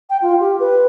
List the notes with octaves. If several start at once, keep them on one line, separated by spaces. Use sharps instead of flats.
G5
F4
G4
B4